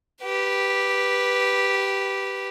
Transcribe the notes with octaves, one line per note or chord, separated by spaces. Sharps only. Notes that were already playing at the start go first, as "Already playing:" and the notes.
G4 B4